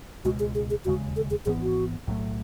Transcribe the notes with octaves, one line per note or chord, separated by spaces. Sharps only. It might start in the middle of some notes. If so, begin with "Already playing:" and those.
C#2 B2 G#3 F#4
G#4
G#4
G#4
E1 D#2 C#3 G#3 F#4
A4
G#4
G#1 G#2 E3 B3 G#4
F#4
B1 A2 F#3 A3